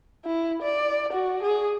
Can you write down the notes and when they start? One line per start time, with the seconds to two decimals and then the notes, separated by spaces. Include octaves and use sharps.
0.25 E4
0.62 D5
1.13 F#4
1.42 G#4